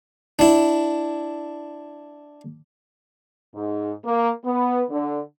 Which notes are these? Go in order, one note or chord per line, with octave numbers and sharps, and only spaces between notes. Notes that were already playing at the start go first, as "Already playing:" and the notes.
D4 E4
G#2
A#3
B3
D3